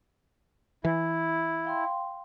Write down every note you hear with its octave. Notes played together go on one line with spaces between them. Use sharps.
E3 E4
F5 G5 C6